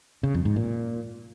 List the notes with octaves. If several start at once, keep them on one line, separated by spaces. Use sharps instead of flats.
C#3
F2
G#2
A#2